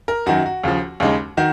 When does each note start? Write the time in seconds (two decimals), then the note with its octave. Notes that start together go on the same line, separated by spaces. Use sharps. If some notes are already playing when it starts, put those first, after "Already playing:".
0.08 A#4
0.26 F#2 D#3 F#3 F#4
0.46 F#4
0.64 D#2 C#3 F3
1.00 D#2 C#3 G#3 D#4
1.37 D#3 F#4